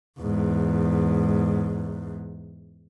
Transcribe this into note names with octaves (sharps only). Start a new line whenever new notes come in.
E2 G#2